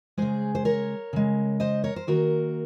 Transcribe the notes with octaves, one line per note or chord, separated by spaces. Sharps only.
C#3 G#3 G#4 C5
C5
A#4 C#5
C#3 G#3
C5 D#5
A#4 C#5
C5
D#3 A#3 F#4 A#4